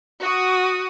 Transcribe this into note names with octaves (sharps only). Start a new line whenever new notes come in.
F#4 D#6